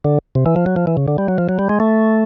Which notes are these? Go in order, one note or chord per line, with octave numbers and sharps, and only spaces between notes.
D3
C3
E3
F3
F#3
F3
E3
C#3
D3
G3
F#3
F3
F#3
G3
G#3
A3